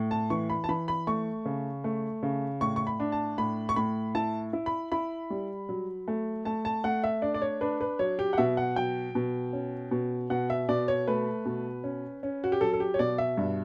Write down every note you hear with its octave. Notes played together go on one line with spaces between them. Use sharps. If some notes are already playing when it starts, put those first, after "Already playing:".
Already playing: A2
A5
E3 C#6
B5
A5
E3 B5
B5
A3 C#6
C#3
A3
C#3
A2 C#6
C#6
B5
D4
A5
A2 B5
C#6
A2 B5
E4 A5
E4
B5
E4 B5
G3
F#3
A3
A3 A5
A5
A3 F#5
E5
D4 D5
D5
C#5
D4 B4
B4
F#3 C#5
G4
F#5
B2 E5
F#5
F#3 G5
B2
C#4
B2
B2 F#5
E5
B2 D5
C#5
A3 B4
B2
C#4
C#4
F#4
G4
F#3 A4
A4
G4
C#5
B2 D5
E5
G2